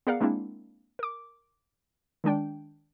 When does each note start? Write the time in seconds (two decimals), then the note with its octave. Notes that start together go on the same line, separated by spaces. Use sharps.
0.07 B3 G#4 A#4 D5 F5 F#5
0.21 G#3 A#3 C4 D4 E4
0.99 A#4 D6
2.24 D#3 G#3 D4 G5